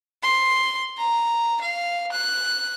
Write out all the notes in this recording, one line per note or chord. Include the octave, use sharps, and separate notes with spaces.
C6
A#5
F5
F#6